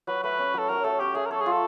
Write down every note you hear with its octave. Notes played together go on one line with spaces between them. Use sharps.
F#3 B4
A3 B4
C#4
F#3 A4
F#3 A#4
A3 A4
C#4 G4
A3 G#4
A#4
A4 C#5
G#4
F4
A4